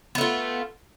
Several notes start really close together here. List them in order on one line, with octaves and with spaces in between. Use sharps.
B3 A3 F4